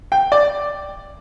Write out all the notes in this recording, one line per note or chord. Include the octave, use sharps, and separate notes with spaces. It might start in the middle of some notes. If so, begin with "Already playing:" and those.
G5
D5